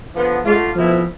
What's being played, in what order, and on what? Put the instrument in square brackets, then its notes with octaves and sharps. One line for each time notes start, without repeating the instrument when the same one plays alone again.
[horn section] D3 F3 B3
[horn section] D3 A3 D4 F4 [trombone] G#3
[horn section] B2 A3 C4 E4 [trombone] F3